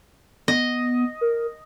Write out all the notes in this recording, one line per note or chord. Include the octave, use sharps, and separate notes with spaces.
B3 D#5
A#4